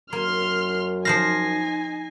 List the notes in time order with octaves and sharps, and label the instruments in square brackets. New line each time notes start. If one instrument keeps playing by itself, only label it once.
[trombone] F#2 [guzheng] A#3 [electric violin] C6 F6
[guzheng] F3 C5 F5 [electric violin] D#4 G#5 [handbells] A#6 C7